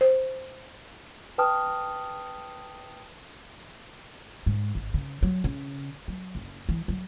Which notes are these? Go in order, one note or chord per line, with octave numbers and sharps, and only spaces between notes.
C5
B4 G5 A5 D#6 F6
G#2
G#1
C#3
F#3
C#3
F#3
F#1
E3
F#3